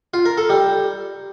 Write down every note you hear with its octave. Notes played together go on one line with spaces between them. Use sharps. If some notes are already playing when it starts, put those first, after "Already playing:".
F4
A#4
A4
G3